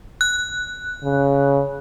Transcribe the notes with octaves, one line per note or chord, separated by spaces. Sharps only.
F#6
C#3